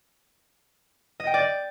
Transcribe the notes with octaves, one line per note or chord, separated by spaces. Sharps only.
D#5
G5
D5